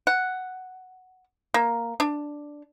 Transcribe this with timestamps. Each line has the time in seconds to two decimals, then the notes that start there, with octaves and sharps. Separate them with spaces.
0.07 F#5
1.54 A#3
2.00 D4